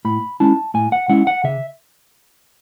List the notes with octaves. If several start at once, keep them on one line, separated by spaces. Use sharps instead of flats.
A2 B5
G#3 C#4 E4 A5
A2 G#5
F#5
G#3 C#4 E4 F#5
F#5
C#3 E5